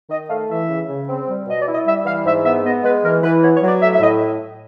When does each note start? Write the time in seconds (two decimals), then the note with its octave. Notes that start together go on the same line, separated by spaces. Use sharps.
0.10 D#3 D#5
0.29 A3 F5
0.49 E3 E5
0.69 C#3
0.88 C#3
1.07 C4
1.28 G3
1.47 B2 D#5
1.59 D5
1.66 E4
1.73 D#5
1.85 G3 E5
2.05 E3 F5
2.25 G#2 E5
2.44 B3 E5
2.64 B3 D#5
2.83 G#3 B4
3.03 E3 A#4
3.23 E3 B4
3.42 B3 C#5
3.55 C#5
3.62 F#3
3.68 D5
3.81 A2 E5
3.93 E5
4.00 A2 D#5